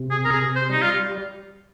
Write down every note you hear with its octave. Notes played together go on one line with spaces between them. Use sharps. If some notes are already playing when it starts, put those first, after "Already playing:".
Already playing: C3
G#4
A#4
C3 G#4
C5
G3 D#4
F4